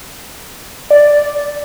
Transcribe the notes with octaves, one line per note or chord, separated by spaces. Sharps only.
D5